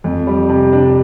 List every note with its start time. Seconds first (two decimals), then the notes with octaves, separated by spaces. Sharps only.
0.04 F2
0.27 G3
0.49 C3
0.73 D4